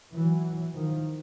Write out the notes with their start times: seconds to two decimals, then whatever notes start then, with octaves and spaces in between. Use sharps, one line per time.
0.14 E3 F#3
0.73 D#3 F3